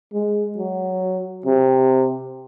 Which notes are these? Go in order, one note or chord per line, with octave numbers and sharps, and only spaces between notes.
G#3
F#3
C3